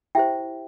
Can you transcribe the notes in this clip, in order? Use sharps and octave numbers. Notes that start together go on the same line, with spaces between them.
E4 G4 C5 E5 G5